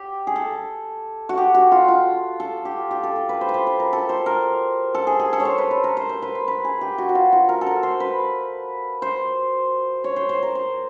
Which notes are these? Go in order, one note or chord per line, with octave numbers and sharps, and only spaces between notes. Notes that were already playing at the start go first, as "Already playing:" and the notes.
Already playing: G4
G#4
A4
F#4
G4
F#4
F4
F4
A4
G4
G4
A4
A4
B4
C5
B4
C5
B4
A#4
A4
C5
A#4
A4
G#4
G#4
A4
C#5
C5
B4
B4
A#4
C5
C5
B4
B4
B4
G#4
G4
F#4
F#4
F4
F#4
A#4
A4
A#4
C5
B4
C5
C#5
C5
C5
A#4
C5